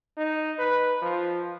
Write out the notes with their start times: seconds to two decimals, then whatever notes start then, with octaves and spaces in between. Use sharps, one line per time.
0.17 D#4
0.59 B4
1.02 F3